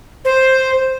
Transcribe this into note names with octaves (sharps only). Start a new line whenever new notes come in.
C5